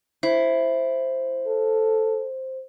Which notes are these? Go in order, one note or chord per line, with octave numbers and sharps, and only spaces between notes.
E4 C5
A4